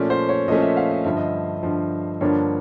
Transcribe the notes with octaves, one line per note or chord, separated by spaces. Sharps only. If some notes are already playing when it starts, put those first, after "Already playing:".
Already playing: A#2 F3 A3 C#4 D5
C5
C#5
A#2 F3 A3 C#4 D#5
E5
F5
D#5
G2 D3 F3 E5
D#5
G2 D3 F3
G2 D3 F3 A#3 D4 C#5